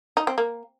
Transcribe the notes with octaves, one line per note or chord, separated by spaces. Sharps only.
D#4
C4
A#3